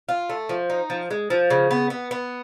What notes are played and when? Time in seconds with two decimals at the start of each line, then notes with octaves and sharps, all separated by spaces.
0.09 F4
0.30 A3
0.49 F3
0.70 D#4
0.90 F3
1.11 G#3
1.30 F3
1.50 C#3
1.71 B3
1.90 B3
2.11 B3